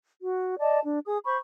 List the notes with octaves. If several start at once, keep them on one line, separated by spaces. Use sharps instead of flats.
F#4
D5 D#5 A5
D4
G#4 D#6
C5 B5 C#6